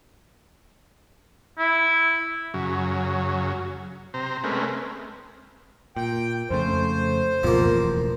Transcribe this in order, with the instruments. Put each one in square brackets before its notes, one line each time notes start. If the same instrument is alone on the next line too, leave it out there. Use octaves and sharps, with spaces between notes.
[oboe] E4
[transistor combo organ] F#2 C#3 F#3
C3 C5 A#5
G#3 A3 C4 C#4 A#4 B4
[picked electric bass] A#2 [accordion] G5
[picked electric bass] F2 C#3 A3 [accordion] C5
[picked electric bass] C#2 F#2 B2 [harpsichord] F3 A#3
[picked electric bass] E1 A1